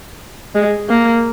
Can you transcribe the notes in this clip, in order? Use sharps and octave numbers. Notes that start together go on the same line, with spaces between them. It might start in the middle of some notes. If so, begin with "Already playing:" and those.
G#3
A#3